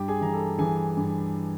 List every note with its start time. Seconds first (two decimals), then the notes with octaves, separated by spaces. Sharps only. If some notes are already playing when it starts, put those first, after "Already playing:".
Already playing: G2 G4 G5
0.08 G#4 G#5
0.21 E3 A#5
0.33 A4 A5
0.58 E3 G#4 G#5
0.97 G2